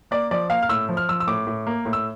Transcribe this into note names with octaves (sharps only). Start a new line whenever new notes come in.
A#3 D5
F3 D5
A#3 F5
F6
A2 E6
F3
F6
F3 E6
E6
A2 D6
A2
A#3
A2
E6